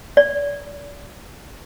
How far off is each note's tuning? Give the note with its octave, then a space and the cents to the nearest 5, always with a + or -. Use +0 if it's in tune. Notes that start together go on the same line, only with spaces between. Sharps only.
D5 -35